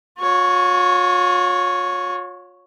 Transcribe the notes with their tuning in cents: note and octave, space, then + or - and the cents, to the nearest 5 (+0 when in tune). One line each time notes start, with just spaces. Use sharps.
F4 +45 C#5 +0